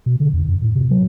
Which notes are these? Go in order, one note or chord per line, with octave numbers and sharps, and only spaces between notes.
B2
D3
E2
F#2
A2
C3
F#3